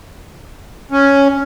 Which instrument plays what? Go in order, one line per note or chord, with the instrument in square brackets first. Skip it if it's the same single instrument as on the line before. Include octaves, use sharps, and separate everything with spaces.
[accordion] C#4